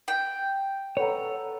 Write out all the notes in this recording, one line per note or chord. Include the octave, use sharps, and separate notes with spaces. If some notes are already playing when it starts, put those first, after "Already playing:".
G5
A4 B4 C#5 F#5 A#5